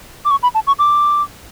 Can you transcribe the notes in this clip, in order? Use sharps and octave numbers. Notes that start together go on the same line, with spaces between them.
D6
C#6
B5
A5
C#6
D6